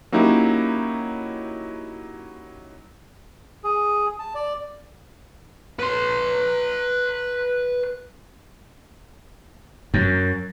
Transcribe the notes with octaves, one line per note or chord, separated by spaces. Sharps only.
F#3 A#3 C#4 D#4 E4 G4
G#4
A5
D5
B4 C6
F#2